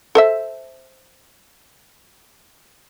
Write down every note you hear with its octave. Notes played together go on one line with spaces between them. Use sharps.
A4 C5 E5